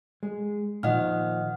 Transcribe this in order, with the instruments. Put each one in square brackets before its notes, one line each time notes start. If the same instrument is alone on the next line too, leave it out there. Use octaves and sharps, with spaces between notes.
[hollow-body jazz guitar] G#3
[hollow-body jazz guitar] A#2 D#3 F3 [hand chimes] D#5 F#5 F6